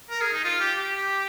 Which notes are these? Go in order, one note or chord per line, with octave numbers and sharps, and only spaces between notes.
A#4
G#4
D#4
F4
G4
G4